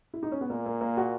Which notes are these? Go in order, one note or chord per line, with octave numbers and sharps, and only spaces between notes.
E4
D#4
C#4
B3
A#2 A#3
A#3
A#3
F#4